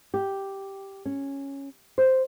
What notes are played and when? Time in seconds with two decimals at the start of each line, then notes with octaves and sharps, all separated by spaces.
0.14 G4
1.05 C#4
1.98 C5